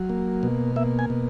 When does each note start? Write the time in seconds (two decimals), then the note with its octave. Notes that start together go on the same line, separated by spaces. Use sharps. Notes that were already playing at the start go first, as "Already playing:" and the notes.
Already playing: F#3
0.09 A#3
0.43 B2
0.76 A#3 E5
0.99 G#5
1.10 B2